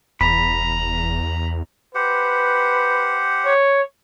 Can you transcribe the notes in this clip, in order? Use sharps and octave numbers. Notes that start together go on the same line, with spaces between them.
F1 E2 A#5 B5
G4 B4 C5 F#5
C#5